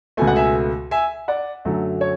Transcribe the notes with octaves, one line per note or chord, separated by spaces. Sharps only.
C#2 B2 A3 G#5
F#5
E5 G#5
E5 G#5
D5 F#5
F#2 D3 F#3 A3
C#5